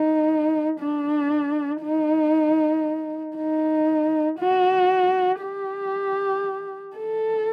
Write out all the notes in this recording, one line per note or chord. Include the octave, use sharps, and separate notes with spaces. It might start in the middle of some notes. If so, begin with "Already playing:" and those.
Already playing: D#4
D4
D#4
D#4
F#4
G4
A4